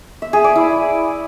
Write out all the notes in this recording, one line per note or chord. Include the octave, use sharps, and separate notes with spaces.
E5
G#4
D5
E4